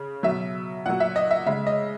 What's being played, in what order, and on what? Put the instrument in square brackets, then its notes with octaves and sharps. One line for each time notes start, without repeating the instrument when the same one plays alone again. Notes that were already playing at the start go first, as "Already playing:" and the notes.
Already playing: [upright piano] C#3
B2 F#3 E5
A#2 F#3 F#5
E5
D#5
E5
C#3 G#3 E5
D#5